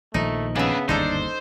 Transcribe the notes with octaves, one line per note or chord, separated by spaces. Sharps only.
A#1 D#3 F3 A3 D#4
C#3 B3 D4 B4 E5
G1 D#2 G#2 D4 D#4 A4 C5